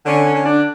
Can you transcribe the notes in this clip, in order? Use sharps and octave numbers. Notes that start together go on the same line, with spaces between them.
D3 C#4
C#4
D3
D4